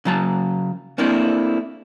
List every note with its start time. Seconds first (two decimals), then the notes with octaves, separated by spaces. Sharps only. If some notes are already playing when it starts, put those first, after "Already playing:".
0.05 C#3 F#3 A5
0.98 A3 A#3 C4 D4 E4